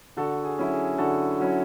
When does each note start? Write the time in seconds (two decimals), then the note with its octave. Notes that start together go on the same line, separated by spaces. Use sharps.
0.17 D3 F#4 A4
0.44 G#4
0.58 F#3 C#4 E4
0.71 G#4
0.98 D3 F#4 A4
1.40 F#3 C#4 E4